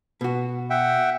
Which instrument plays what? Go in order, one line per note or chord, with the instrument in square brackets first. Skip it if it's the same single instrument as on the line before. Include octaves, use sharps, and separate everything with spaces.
[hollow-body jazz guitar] B2 F#4
[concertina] E5 F#5 G5